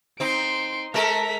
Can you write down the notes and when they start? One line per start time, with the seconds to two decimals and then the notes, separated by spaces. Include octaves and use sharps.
0.20 C4 D#4 C6 D7
0.94 G#3 A4 A#4 A#5 B6